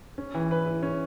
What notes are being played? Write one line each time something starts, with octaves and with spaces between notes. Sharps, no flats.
C#4
E3
B4
E4
C#4